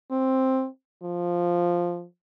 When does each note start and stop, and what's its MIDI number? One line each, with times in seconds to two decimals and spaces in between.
0.11 0.67 60
1.03 2.04 53